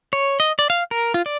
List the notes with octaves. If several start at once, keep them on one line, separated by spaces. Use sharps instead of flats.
C#5
D#5
D5
F5
A#4
F4
D5